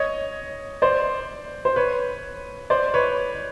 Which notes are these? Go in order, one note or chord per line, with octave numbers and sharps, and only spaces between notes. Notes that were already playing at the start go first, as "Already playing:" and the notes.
Already playing: C#5 D#5
C5 D5
C5
B4 C#5
C5 D5
B4 C#5